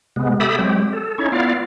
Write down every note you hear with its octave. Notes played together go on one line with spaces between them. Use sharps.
C3 G#3 B3
G4 A4 E5 B5 D#6
F#3 G#3 C4 G4
A4
C#4 D#4 E4 C#5
B3 E4 F4 D5 F5